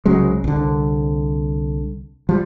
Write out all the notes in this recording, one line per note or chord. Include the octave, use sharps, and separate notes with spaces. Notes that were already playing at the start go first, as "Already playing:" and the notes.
C2 C#3 F#3 G#3
C2 D3
F3 G3